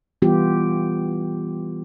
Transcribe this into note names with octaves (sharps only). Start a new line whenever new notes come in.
E3 G3 B3 F4 G4